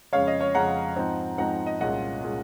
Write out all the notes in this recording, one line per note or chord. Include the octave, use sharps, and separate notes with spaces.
F2 C#3 G#3 C#4 C#5 F5
D#5
C#5
F2 C#3 G#3 C#4 F#5 A#5
G#2 F3 C4 D#4
G#2 F3 C4 D#4 F#5 A#5
D#5
C2 A#2 G#3 C#4 D#5 F#5
A#2 G#3 C#4